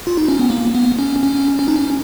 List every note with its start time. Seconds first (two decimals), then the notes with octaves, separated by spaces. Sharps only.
0.07 F4
0.17 D#4
0.28 C#4
0.40 B3
0.50 A#3
0.75 B3
0.99 C#4
1.23 C#4
1.59 C#4
1.68 D#4
1.76 C#4